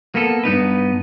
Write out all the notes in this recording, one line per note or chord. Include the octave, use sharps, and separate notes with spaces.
A#3 B3 A4
G2 B3 D#4 B4